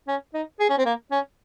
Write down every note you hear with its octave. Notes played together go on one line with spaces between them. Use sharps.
C#4
D#4
G#4
C#4
C4
A#3
C#4